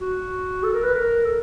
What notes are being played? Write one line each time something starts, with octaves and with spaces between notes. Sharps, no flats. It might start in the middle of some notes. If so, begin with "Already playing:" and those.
F#4
A4
A#4
B4
A#4
A4